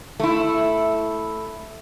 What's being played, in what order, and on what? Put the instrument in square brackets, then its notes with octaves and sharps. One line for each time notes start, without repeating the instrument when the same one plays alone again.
[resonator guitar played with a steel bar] A3 E4